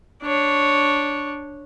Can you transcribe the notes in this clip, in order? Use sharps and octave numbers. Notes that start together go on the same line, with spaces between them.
D4 C#5